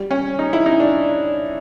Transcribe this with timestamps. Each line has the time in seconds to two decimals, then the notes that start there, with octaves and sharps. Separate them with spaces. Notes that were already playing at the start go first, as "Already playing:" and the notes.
Already playing: G3
0.11 C#4
0.39 D#4
0.53 E4
0.66 D#4
0.80 D4